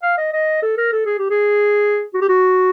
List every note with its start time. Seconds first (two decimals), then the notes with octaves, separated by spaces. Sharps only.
0.03 F5
0.17 D#5
0.33 D#5
0.63 A4
0.78 A#4
0.93 A4
1.06 G#4
1.18 G4
1.30 G#4
2.14 F#4
2.21 G4
2.29 F#4